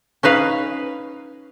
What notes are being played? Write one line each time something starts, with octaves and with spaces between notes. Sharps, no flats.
C#4 D#4 B4 F5